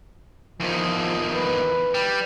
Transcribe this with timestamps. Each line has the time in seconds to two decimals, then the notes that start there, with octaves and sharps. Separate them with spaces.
0.60 E2 D#3 F3
1.35 B4
1.94 G3